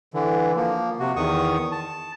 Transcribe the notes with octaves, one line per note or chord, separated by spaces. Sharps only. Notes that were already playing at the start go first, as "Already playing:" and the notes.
D3 E3
F3 A#3
C3 F#4
E2 D#3 C#6 D#6
A5